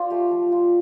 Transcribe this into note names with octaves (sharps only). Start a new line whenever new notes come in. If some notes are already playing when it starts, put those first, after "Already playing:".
Already playing: F4 C5 D5 F5
A3 G4
F3
F4